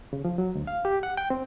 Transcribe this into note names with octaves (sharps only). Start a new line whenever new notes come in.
C#3
F3
F#3
D2
F5
G4
F#5
G5
C4